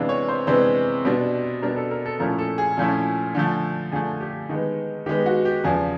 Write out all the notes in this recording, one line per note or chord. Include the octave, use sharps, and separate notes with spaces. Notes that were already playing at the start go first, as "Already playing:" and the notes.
Already playing: C3 E3 G#3 B3 D4 F5
C#5
C5
C3 E3 G#3 B3 D4 C5
B2 G3 B3 D4
B2 G3 B3 D4 A#4
A4
A#4
A4
A#2 F3 A3 C#4 E4 A#4
A4
G#4
A#2 F3 A3 C#4 E4
D3 F3 A3
D3 F3 A3 G#4
G4
D#3 G#3 B3
D#3 G#3 B3 G4
F#4
G4
E2 C#3 F3 G#4